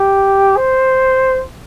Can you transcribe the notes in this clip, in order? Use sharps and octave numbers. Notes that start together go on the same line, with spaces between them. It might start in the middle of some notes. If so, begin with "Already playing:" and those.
Already playing: G4
C5